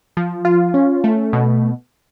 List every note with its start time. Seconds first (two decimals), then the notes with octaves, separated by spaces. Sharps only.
0.17 F3
0.45 F4
0.74 C#4
1.04 A3
1.33 B2